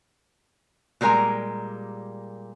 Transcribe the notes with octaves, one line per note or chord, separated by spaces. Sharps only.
A#2 G3 G#3 A#4 G#5 A#5